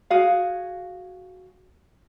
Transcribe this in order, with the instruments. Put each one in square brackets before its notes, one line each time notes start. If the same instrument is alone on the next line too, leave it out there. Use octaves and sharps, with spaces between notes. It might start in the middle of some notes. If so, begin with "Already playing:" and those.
[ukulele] F#4 G#4 F5